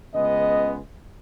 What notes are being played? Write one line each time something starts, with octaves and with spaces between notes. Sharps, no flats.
C#2 C#3 G#3 B3 D#5